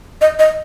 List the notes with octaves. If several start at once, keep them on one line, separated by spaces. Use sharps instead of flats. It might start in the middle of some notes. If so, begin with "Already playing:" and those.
D#5
D#5